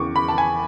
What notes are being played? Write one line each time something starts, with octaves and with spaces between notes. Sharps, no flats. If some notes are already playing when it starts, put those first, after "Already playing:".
Already playing: E2 C#3 E3 C#6 D6
B5
A5
G#5